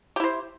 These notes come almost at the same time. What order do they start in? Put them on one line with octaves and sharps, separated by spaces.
G4 E4 C5